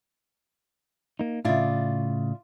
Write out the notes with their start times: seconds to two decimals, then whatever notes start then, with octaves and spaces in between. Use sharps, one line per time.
1.19 A#3 D#4
1.45 A2 C#3 E4 F4 D5